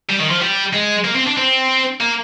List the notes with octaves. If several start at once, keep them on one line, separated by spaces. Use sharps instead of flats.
G3
D#3
F3
G3
G#3
A#3
C4
D4
C4
A#3